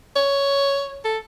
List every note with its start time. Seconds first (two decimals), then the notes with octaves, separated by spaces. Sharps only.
0.16 C#5
1.05 A4